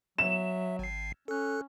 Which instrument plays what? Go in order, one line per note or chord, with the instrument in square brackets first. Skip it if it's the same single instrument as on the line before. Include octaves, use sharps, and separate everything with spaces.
[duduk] F#3 [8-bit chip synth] E5 [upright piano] E7
[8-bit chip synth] G#1 C7
[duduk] C#4 [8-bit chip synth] A4 F#6